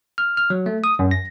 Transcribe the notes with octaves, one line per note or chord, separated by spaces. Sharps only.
F6
F6
F#3
A3
D#6
F#2
A#6